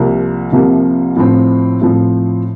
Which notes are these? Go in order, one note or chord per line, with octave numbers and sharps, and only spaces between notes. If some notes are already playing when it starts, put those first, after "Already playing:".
Already playing: C2 C3 F3 A#3
C2 C3 F3 A#3
A2 F3 C4
A2 F3 C4